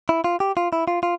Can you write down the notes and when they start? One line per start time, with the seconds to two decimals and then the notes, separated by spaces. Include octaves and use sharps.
0.09 E4
0.24 F4
0.40 G4
0.57 F4
0.73 E4
0.88 F4
1.03 F4